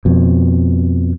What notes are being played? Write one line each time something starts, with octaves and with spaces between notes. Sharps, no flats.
F2 B2